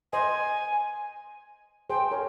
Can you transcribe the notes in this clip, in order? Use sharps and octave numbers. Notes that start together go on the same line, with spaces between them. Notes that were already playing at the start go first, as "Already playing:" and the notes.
C5 D#5 G#5
G#4 C5 G5
A#4 C#5